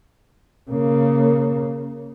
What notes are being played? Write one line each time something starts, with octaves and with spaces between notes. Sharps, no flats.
C#3 A#3